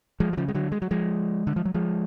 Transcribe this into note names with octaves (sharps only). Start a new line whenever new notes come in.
F3 G#3
F#3
C#3 F3
G#3
D3 F#3
G#3
F#3
F3 G#3
D3
F3
F#3
F3 G#3